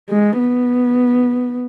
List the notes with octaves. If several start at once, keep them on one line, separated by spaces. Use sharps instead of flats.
G#3
B3